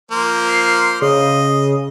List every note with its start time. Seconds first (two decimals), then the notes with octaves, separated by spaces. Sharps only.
0.11 F3 A#3 C5
0.49 C7
1.02 C#3 D#5